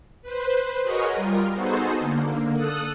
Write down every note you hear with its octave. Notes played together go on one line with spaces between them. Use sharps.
B4 C5
F#4 G#4 A#4 B4 C#5 D#5
G3 F4 A#4
B3 D#4 F#4 G#4 A4 C5
D3 A#3
A4 D#6 F#6